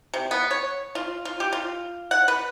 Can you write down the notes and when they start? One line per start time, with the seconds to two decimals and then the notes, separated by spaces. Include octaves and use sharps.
0.14 C3
0.31 B3
0.51 C#5
0.95 F4
1.25 F4
1.40 G4
1.53 F4
2.11 F#5
2.28 B4